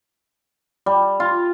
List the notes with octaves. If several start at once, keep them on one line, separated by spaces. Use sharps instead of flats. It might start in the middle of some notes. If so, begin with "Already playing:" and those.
G3
F4